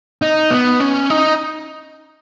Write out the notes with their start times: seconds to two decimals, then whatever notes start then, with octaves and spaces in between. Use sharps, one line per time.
0.22 D#4
0.51 B3
0.80 C#4
1.10 D#4